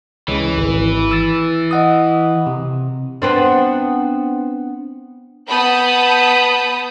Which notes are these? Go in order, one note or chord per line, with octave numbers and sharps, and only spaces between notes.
C#2 C#3 E3
G#1
E6 A6
D#5 F#5 D#6
C3
B3 C4 D4
B3 A5 B5 D#6 G6